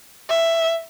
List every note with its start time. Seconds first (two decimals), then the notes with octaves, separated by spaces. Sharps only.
0.30 E5